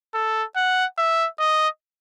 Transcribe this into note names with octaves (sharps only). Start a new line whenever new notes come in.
A4
F#5
E5
D#5